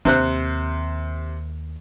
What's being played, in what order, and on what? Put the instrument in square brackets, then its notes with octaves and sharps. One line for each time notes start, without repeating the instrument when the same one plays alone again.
[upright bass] D#2 [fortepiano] C3 C5 F#6